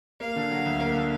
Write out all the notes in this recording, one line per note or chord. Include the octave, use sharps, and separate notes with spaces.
A#3 F5
D3
F#3
D2
A#3
D3